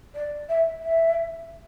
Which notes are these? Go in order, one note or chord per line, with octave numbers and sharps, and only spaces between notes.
D5
E5
E5